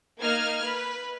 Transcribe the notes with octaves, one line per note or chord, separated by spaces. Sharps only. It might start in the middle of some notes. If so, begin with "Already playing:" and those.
A#3 D#4 F6 G#6
B4